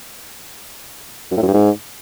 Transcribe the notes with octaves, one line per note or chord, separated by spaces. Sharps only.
F#2
A2
F#2
G2
G#2